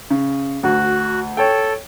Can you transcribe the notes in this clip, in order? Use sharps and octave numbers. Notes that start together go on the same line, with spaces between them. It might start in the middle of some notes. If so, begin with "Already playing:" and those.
C#3
D2 F#4
A4 C#5 G5